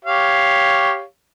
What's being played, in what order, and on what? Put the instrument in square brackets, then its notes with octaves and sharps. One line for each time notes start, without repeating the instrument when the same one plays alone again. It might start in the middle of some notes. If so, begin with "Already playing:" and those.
[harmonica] G4 C#5 F5